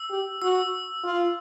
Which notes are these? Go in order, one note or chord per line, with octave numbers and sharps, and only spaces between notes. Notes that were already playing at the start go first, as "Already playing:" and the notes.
Already playing: E6
G4
F#4 E6
F4